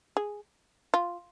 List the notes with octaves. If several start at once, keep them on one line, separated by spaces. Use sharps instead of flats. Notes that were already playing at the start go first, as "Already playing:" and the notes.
G#4
F4